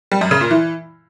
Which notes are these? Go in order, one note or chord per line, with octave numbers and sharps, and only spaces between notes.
G3
F#2
C#3
A#2
E3